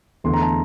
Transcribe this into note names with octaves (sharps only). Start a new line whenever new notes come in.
E2 D3 A3 C6
A#5
A5